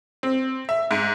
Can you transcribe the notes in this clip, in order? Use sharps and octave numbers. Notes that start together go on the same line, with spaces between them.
C4
E5
G#2